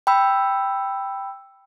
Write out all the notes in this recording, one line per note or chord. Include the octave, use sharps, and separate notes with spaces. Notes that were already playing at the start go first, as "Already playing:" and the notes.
G5 B5 E6